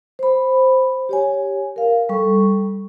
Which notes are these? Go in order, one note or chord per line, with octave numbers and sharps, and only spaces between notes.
C5 B5
G4 C#5 G#5
A#4 F5
G3 A4 C#6